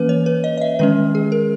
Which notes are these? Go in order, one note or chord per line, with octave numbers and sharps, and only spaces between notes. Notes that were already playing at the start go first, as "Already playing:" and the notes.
Already playing: E3 A#3 C#4 B4
C#5
B4
D#5
D#5
E5
D#3 G#3 C#4 B4
G#4
A#4